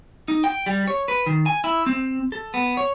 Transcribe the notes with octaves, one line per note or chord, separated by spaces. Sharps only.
D#4
G5
G3
C#5
B4
D#3
G#5
E4
C4
A4
B3
C#5